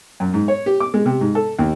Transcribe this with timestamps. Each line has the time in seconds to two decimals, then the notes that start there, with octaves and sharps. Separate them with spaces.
0.20 F#2
0.34 G#2
0.48 C#5
0.66 G4
0.80 D6
0.94 G#3
1.06 C3
1.21 G#2
1.35 A4
1.59 D#2